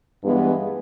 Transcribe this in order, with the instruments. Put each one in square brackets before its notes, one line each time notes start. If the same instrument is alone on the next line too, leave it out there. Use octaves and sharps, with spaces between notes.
[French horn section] G2 E3 G#3 B3